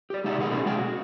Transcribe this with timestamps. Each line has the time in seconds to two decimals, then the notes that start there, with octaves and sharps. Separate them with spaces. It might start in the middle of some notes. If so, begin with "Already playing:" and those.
0.10 G4 D5
0.24 G#3 D#4 E5 F#5
0.38 B2 D#3 G#4 E5 F#5
0.50 G#3 A#3 C#4 F#4 G#4 A4
0.66 B2 G#3 G#4 F5 G5
0.79 F#4